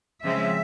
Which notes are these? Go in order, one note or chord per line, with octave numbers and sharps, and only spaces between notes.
C#3 F3 G#3 C4 E5